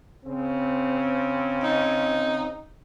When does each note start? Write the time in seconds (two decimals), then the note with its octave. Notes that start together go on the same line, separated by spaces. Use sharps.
0.25 C#3 C4
1.63 D#4